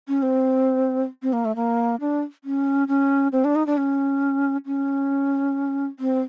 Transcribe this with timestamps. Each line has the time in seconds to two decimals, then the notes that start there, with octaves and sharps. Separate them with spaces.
0.08 C#4
0.22 C4
1.23 C4
1.33 A#3
1.45 A3
1.56 A#3
2.00 D4
2.44 C#4
2.88 C#4
3.32 C4
3.45 D4
3.56 D#4
3.67 D4
3.77 C#4
4.66 C#4
5.99 C4